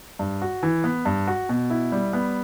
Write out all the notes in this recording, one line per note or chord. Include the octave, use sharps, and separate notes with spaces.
G2
F#4
E3
B3
G2
F#4
B2
E4
G3
B3